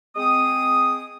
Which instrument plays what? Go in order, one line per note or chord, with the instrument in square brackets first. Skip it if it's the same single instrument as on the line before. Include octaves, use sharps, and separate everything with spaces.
[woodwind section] G#3 C4 D#6